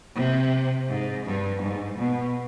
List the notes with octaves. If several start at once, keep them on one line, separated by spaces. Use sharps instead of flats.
C3
G#2
G2
G#2
B2